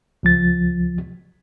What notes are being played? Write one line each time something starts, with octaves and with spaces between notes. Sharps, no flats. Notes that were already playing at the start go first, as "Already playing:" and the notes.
C#2 F3 A6